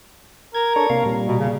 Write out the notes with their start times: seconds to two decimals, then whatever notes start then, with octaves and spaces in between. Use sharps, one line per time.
0.54 A#4 G#6
0.76 D4 A4 C#5
0.90 C3 A#3 F5
1.06 A#2 G3
1.27 B2
1.39 C#3